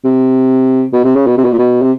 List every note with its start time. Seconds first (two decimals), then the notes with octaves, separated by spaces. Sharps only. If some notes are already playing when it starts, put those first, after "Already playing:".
0.05 C3
0.93 B2
1.04 C3
1.15 C#3
1.27 B2
1.37 C3
1.44 B2
1.52 A#2
1.59 B2
1.82 C3